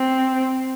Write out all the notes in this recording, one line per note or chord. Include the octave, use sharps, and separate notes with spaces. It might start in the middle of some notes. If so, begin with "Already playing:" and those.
Already playing: C4